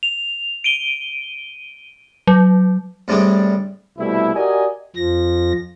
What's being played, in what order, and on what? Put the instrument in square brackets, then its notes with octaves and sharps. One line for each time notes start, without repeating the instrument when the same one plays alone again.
[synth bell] F7
D7 D#7 G7
F#3
[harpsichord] A2 C3 G3 G#3 D4
[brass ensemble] C2 B2 G3 A3 E4
F#4 G4 A#4 D5 D#5 G#5
[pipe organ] F2 F3 A#6